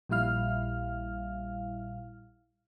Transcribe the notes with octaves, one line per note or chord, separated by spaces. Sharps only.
A#1 A#2 G3 E4 F5 F6